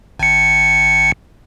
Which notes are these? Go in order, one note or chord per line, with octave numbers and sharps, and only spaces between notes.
G#1 C#7